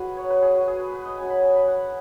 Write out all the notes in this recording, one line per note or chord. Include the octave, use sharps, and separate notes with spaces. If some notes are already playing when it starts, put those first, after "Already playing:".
Already playing: F#3 F#4 G#4 B4 F#5 B5
C#5
B4
G#4
F#4
G#4
B4
B4
D#5
F#3 C#4 G#5
B5
G#5
B5
F#5